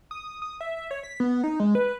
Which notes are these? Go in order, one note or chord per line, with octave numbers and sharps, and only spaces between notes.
D#6
D#6
E5
E5
C#5
B6
B3
D#4
G#3
B4